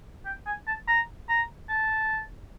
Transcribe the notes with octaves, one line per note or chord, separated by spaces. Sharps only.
G5
G#5
A5
A#5
A#5
A5